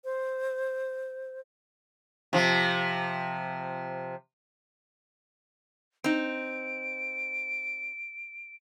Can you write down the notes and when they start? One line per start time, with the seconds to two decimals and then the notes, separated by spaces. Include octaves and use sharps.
0.05 C5
2.33 C3 F3
6.04 C4 D#4 D7